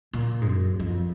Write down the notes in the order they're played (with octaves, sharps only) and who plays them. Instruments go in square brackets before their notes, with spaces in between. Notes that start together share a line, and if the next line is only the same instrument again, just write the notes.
[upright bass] A#2
G#2
F#2
F2